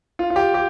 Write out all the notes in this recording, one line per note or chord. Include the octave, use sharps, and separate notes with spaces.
F4
F4
G4
G4